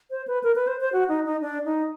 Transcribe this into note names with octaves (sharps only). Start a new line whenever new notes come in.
C5
B4
A#4
B4
C5
C5
F#4
D#4
D#4
D4
D#4